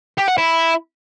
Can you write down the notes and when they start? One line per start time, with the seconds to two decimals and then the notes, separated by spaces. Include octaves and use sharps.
0.18 G4
0.28 F#5
0.38 E4